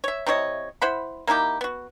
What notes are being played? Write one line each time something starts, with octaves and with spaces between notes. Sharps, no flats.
C#5 E5
C3 E4 C#5 D#5
E4 C5 F#5 B5
A#3 D#4 E4 G4
B3 F#4